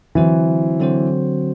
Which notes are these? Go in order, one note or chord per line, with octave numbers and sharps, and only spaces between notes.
D3 E3 F#3 C4 F#4 C5
D3 F#3 C4 F#4 C5